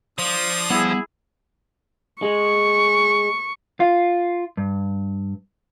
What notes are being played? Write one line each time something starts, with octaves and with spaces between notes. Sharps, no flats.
F3 D4 D#6
G3 B3 E4 G#4 F#5
G#3 C#6
F4
G2